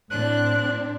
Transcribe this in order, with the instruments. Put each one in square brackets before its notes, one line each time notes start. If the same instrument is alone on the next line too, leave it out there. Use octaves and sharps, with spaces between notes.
[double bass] A2 [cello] C4 D4 [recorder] F#6